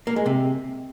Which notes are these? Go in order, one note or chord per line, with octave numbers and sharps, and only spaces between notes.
A#3
G#3
C3